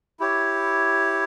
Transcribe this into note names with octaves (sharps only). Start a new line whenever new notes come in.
E4 G4 C#5